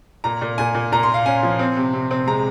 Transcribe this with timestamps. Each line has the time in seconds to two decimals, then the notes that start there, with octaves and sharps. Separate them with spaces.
0.24 A#2 A#5
0.41 A#2
0.58 A#2 G#5
0.75 A#2
0.92 A#2 A#5
1.03 C6
1.09 A#3 F5
1.26 C#4 G#5
1.43 F3
1.59 C4
1.77 C3
1.93 C3
2.11 C4
2.27 G#3 A#5